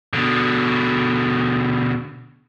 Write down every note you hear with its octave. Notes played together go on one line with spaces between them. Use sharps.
B2 D3